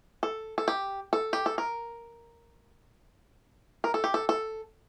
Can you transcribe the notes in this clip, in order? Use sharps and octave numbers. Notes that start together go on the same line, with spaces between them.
A4
A4
G4
A4
G4
A4
A#4
A#4
A4
G4
A4
A4